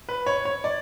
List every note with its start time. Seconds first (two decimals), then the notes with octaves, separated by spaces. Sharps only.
0.09 B4
0.26 C#5
0.45 C#5
0.64 D5